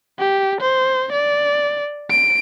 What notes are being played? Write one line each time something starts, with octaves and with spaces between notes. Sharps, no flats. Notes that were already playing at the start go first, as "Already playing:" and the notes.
G4
C5
D5
D7